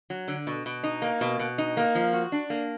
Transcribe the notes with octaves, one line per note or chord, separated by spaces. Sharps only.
F#3
D3
B2
B2
D#4
A#3
B2
B2
D#4
A#3
F3
F#4
D4
A#3